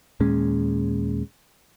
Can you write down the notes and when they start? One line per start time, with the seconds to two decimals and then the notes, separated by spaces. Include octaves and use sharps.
0.20 D#2 A#2 G#3 C#4